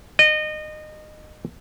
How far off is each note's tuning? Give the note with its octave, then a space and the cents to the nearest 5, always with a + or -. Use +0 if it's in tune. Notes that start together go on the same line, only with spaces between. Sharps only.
D#5 -25